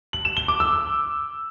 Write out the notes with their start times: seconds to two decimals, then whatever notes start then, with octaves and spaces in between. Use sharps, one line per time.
0.13 F#7
0.25 E7
0.37 G7
0.48 D6
0.60 E6